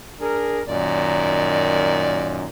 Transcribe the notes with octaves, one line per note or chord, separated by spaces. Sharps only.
D4 G#4 A#4
F#2 A#2 D#3 D5